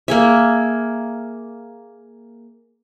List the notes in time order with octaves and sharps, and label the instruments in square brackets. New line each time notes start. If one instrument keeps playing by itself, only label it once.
[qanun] A#3 G#4 E5